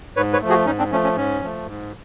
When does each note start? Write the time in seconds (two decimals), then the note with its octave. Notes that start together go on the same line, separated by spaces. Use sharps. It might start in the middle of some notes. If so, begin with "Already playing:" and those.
0.16 G#2 B4 C#5
0.33 B4 C#5
0.41 F3 A3
0.49 F#4 G#4
0.66 G#2 C#4 D#4
0.79 C4 D4
0.91 F3 A3 C#4
1.04 C#4
1.16 G#2 C#4
1.42 F3 A3
1.67 G#2